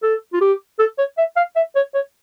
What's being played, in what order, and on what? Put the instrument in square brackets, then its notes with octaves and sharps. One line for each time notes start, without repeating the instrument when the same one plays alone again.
[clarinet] A4
F4
G4
A4
C#5
E5
F5
E5
C#5
C#5